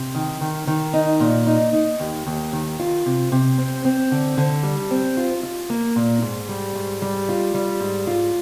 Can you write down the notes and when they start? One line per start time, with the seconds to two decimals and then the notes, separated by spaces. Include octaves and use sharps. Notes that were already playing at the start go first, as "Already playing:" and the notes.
Already playing: C3
0.15 D#3
0.41 D#3
0.67 D#3
0.93 D#4
1.20 A#2
1.47 D#4
1.73 D#4
2.00 D#2
2.26 D#2
2.53 D#3
2.79 F4
3.06 C3
3.32 C3
3.58 C4
3.85 C4
4.11 D3
4.37 D3
4.63 G3
4.91 C4
5.17 F4
5.43 F4
5.70 A#3
5.96 A#2
6.22 G#2
6.49 G3
6.75 G#2
7.02 G3
7.29 F4
7.54 G3
7.80 G#2
8.07 F4